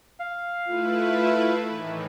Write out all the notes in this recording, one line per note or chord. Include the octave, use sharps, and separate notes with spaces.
F5
A3 E4 F4 B4
A2 D#3 E3